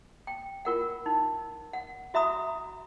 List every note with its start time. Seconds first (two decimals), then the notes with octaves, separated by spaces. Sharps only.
0.27 G5
0.65 F4 A#4 F#5
1.06 D#4
1.73 F#5
2.14 F#4 E5 A#5 B5 D#6